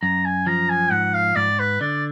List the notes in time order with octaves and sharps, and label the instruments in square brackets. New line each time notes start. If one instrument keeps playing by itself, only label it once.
[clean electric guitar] F#2 [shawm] A#5
[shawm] G#5
[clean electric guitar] F3 [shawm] A#5
[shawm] G#5
[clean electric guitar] G#2 [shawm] F#5
[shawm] F5
[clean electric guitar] G#2 [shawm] D5
[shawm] B4
[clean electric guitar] D3 [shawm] D5